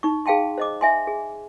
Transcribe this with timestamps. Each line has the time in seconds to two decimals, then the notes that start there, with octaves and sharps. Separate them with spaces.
0.03 D#4 C#6
0.26 G#4 F5 G5 A5 C6
0.58 C5 D#5 D6
0.81 E5 G#5 C6
1.07 G#4